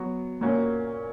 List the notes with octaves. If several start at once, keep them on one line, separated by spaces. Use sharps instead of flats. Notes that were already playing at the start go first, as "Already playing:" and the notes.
Already playing: F#3 B3 F#4
A#2 A#3 C#4 F#4